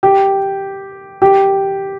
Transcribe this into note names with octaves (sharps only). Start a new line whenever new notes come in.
G4
G4